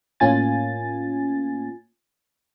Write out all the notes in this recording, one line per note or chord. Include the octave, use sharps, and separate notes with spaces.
A2 A#3 C#4 F4 G#5 A6